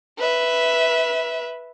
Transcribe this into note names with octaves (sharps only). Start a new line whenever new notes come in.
B4 E5